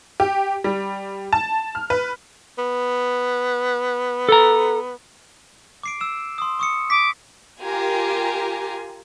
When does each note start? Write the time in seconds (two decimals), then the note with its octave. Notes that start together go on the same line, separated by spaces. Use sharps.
0.20 G4
0.64 G3
1.33 A5
1.75 F6
1.90 B4
2.58 B3
4.29 A4 A#5
5.83 D6 C7 D7
6.01 E6 E7
6.38 C6 D#6
6.59 C#6 D#6 C#7
6.90 D6 B6
7.62 F4 G4 A#4 G#5 A#5